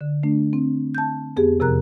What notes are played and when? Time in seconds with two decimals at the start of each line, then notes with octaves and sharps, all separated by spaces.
0.01 D3
0.23 A3 D4
0.53 C4
0.95 A5 G6
1.36 F2 B3 G4 G#4
1.60 E2 C3 F3 A#4 A#5 F#6